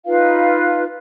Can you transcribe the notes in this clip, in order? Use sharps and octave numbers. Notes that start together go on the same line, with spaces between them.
D#4 F4 B4 F5